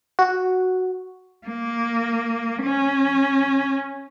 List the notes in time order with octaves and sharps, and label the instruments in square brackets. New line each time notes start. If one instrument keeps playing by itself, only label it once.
[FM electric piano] F#4
[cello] A#3
C#4